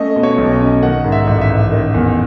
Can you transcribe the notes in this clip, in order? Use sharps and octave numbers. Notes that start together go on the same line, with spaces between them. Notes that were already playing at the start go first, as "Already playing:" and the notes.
Already playing: A3 C#4 D#5
B2
C#5
B1
D#5
C#4
D#3 F#5
G#2
E5
A1
E5
A1
D#3
E2